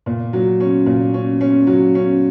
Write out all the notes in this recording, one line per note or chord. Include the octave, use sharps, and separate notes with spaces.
A#2
F#3
C#4
A#2
C#4
C#4
F#3
C#4